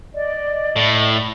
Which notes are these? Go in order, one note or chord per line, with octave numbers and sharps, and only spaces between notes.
D5 D#5
A2